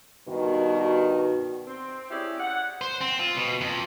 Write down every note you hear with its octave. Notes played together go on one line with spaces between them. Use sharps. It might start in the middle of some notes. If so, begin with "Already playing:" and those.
G2 B2 D#3 F#4
C4
C#4 E4 G4 G#4 D5
F#5
C5
C4
F4
B2
F2